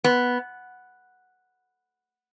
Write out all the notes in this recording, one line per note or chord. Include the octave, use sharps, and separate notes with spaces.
B3